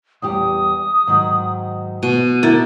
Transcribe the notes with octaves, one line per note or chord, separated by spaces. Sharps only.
E2 G3 G4 D#6
G#2 D#3 F#3
B2 D#7
D3 E4 A#4 A6